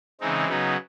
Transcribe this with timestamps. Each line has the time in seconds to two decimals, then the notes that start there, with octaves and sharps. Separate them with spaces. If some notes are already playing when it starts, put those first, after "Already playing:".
0.20 C#3 E3 G#3 C4 D#4
0.48 C#3 F#3 B3 D#4